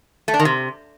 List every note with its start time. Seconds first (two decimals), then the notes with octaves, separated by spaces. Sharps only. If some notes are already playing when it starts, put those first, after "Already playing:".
0.28 A3
0.34 D4
0.39 D#3
0.45 C3